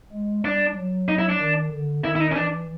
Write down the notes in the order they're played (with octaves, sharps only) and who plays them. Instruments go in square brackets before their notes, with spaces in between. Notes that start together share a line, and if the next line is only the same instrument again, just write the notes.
[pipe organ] G#3
[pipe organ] G3 [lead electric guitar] D4
[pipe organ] F#3
[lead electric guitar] D#4
E4
D4
[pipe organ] D#3
D3
[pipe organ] D#3 [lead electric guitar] E4
[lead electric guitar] E4
D#4
C#4
[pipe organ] E3 [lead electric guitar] D4